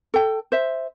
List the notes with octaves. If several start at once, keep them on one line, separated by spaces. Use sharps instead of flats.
A4 G5
C5 E5